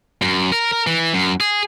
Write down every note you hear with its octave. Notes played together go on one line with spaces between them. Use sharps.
F#2
A#4
A#4
E3
F#2
G#4